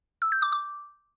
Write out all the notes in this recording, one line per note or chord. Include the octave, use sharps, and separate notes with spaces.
E6
G6
D6
D6